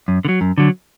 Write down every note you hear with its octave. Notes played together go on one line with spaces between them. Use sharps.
F#2
D3
F#3
F#2
D3 F#3